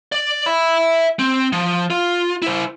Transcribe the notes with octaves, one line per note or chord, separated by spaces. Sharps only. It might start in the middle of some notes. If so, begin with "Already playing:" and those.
D5
E5 B5
C4
F3
F4
E4 C5